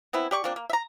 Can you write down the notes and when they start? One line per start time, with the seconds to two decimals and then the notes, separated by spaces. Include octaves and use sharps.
0.13 E3 B3 C4 E4
0.31 G4 D5 C#6
0.44 F3 A#3 C4 D4
0.56 A#3
0.70 E5 A#5